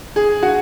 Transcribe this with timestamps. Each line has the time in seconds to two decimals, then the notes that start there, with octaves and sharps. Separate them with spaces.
0.16 G#4
0.43 F#4